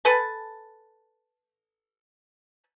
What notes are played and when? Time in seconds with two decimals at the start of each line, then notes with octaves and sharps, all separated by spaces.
0.05 A4 B4 G#5 A5